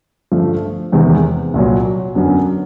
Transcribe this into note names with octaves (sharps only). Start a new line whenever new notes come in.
G2 D3 F3 A3
E2 C3 D#3 G#3 B3
C2 A#2 F#3
F#2 D3 F#3 B3 D4